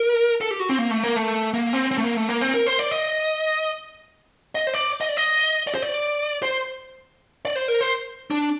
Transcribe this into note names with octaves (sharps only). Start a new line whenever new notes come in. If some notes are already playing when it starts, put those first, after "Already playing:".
Already playing: A#4
A4
G4
F#4
C4
A#3
A3
A#3
A3
A#3
C4
C4
A3
A#3
A3
A#3
C4
A#4
C5
D5
D#5
D#5
C5
D5
D#5
D5
D#5
D5
C5
D5
C5
D5
C5
A#4
C5
D4